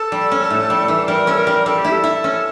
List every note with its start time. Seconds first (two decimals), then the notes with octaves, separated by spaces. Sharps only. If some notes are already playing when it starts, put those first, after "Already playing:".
Already playing: A4
0.12 G3
0.31 C#4
0.50 A2
0.70 G3
0.88 E3
1.08 G3 A#4
1.27 C#4 A4
1.37 A#4
1.47 G3
1.66 G3 A4
1.78 G4
1.85 E4
1.92 A4
2.04 E4
2.24 C#4